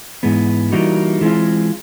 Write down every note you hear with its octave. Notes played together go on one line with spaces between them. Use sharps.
G#2 E3 G#3 B3
E3 G3 A#3 D#4 F#4
E3 G#3 C4 F4